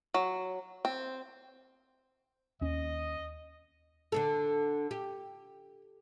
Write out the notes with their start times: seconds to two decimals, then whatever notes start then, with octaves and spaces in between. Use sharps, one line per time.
0.14 F#3
0.85 C4
2.61 D#2 C#4 D#5
4.12 D3 D4 A4
4.91 G4